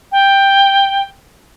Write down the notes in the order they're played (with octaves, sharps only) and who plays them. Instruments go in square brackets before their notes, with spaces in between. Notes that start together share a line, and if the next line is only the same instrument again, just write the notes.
[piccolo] G5